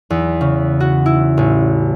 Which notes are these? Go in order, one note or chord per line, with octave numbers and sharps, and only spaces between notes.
E2
C#3
F#4
E4
A1